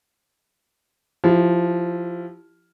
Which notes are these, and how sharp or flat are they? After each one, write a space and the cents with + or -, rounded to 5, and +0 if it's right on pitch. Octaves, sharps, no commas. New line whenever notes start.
F3 +0 E4 +15 G4 -10